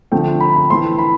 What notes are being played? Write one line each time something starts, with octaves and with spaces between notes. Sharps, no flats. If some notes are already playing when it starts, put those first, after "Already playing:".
D3 F3 A3 C4 G5
B5
B5
E3 A3 C4 C6
B5